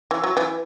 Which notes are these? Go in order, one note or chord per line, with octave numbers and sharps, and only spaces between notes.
E3
F#3
E3